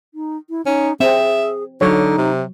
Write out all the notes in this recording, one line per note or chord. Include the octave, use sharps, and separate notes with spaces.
D#4
E4
C#4 D#4
C4 G#4 E5
D3 F#3 D#4 C#5
C3